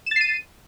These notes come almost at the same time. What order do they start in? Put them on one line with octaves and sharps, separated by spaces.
E7 A6 C7 D#7